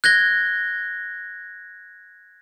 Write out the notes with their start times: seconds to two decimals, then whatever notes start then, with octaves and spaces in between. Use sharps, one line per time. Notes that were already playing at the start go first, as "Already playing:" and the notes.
0.04 F#6 G#6 A#6 G7